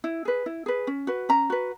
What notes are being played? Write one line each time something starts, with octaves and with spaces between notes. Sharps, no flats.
E4
G#4 B4
E4
G#4 B4
C#4
F#4 B4
C#4 A#5
F#4 B4